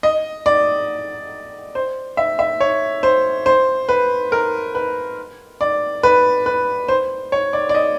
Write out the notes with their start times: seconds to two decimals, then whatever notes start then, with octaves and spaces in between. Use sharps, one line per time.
0.03 D#5
0.46 D5
1.75 C5
2.17 E5
2.39 E5
2.60 C#5
3.03 C5
3.46 C5
3.89 B4
4.32 A#4
4.75 B4
5.61 D5
6.03 B4
6.46 B4
6.88 C5
7.32 C#5
7.53 D5
7.69 D5
7.75 D#5